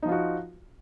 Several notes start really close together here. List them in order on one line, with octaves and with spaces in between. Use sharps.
D#4 F3 F4 F#4